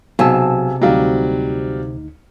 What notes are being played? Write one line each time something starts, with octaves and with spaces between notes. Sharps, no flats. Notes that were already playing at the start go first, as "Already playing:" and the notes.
B1 C3 G#4 F5 G#5 A5 E6
D2 F#3 G3 C4 D#4 F5